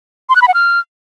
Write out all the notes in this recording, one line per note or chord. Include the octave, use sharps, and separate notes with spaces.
C6
F#6
B5
F#5
F6